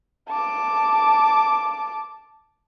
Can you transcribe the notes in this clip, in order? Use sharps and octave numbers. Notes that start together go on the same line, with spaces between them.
A5 D6